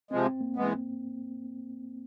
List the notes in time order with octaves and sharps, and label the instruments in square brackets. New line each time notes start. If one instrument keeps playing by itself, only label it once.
[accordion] C3 F3 G#3 [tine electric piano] C4
[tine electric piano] C4
A#3
[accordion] E3 G#3 B3